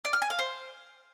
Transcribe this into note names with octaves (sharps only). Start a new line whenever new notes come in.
D5
F6
G#5
F5
C5